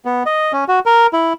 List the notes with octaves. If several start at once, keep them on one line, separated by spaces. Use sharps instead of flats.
B3
D#5
C#4
F#4
A#4
E4